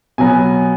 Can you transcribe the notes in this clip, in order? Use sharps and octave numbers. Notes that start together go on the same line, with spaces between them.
B2 F#3 B3 G#5